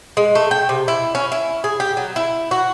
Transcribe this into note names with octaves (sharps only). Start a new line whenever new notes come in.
G#3
A3
G5
C3
E4
C#4
E4
G#4
G4
F#3
E4
F#4